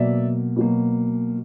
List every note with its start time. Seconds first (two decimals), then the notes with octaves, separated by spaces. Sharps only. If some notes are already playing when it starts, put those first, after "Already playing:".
Already playing: B2 F#3 A#3 D5 E5
0.56 B2 F#3 A#3